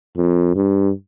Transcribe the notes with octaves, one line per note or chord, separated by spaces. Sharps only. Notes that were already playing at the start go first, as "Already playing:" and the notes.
F2
G2